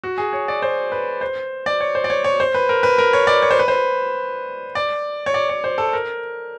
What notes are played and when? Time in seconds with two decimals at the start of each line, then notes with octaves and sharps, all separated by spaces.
0.04 F#4
0.18 G#4
0.33 C#5
0.48 D5
0.62 C5
0.92 B4
1.21 C5
1.66 D5
1.80 C#5
1.95 C5
2.04 D5
2.10 C#5
2.24 C#5
2.40 C5
2.54 B4
2.69 A#4
2.83 B4
2.98 A#4
3.13 C#5
3.27 D5
3.42 C#5
3.51 C5
3.59 B4
3.68 C5
4.75 D5
5.26 C#5
5.34 D5
5.49 C#5
5.64 C5
5.78 A4
5.93 A#4